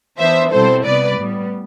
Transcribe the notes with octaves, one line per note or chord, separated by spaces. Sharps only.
E3 B3 D4 C5 E5
B2 G3 C4 E4 A4 C5
C3 G3 B3 B4 D5
A2 G3 B3